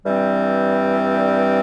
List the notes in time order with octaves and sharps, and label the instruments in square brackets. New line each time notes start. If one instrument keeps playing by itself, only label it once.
[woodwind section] G2 E3 G3 C4